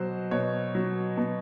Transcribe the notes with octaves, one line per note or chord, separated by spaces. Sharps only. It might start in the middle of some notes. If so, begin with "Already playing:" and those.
Already playing: B2 F#3 C5
B2 C#5
F#3
B2